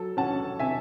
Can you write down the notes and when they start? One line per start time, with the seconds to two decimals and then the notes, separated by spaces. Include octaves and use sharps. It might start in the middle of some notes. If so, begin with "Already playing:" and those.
Already playing: F#3 A4
0.17 C#4 F#5 A5
0.59 C3 E5 G#5